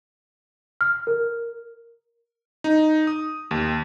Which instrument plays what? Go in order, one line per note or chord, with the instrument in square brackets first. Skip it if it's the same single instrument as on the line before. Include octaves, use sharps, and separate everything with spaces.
[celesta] F6
A#4
[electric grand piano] D#4
D#6
D#2